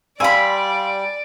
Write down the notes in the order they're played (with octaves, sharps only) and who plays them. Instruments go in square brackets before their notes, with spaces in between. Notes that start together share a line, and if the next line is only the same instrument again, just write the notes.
[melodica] G3 [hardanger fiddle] D5 [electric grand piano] F5 C6 E6 [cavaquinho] G#5 B5